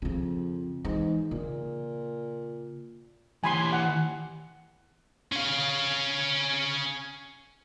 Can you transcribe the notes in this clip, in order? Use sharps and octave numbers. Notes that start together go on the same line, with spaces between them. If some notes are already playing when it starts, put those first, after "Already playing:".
F2 C#3 F3
G#2 E3
A#2 C#3
E3 G4 G#5 B5 C6
F#5
C#4 F5